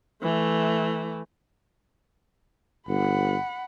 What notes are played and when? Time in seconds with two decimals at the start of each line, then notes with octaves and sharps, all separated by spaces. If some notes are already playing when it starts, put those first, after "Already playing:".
0.23 E3 A3
2.88 G1 F#5 B5